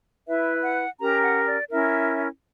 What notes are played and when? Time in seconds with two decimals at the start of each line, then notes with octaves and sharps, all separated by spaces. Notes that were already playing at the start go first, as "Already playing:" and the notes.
0.28 E4 B4 E5
0.63 F#5
0.99 C#4 G4 A#4 A#5
1.23 F#5
1.46 D5
1.70 C#4 E4 A#4 E5